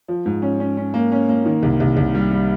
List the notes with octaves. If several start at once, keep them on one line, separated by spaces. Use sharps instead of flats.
F3
G#2
C#4
C#4
C#4
A#3
C#4
A#3
D#3
C2
C2
C2
G3
G3